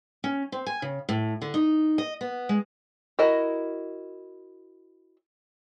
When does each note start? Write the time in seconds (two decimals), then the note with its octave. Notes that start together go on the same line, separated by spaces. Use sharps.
0.24 C#4
0.52 C4
0.66 G#5
0.82 C#3
1.09 A2
1.42 D3
1.54 D#4
1.98 D#5
2.21 B3
2.49 G#3
3.19 E4 F#4 A#4 D#5